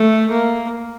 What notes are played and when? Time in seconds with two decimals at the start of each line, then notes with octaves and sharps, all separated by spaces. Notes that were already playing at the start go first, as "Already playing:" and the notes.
Already playing: A3
0.31 A#3